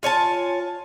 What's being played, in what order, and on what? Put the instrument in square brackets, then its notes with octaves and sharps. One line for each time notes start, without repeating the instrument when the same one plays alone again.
[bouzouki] F4 C#5 G#5 A5